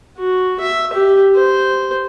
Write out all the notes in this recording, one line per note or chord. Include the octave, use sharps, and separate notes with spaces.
F#4
E5
G4
C5